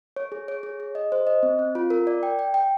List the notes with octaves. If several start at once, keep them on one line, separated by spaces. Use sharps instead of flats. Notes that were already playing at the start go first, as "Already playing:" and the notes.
C#5
G#4
C#5
G#4
G#4
D#5
C5
D#5
C4
C4
F4
A#4
D5
G5
G5
G5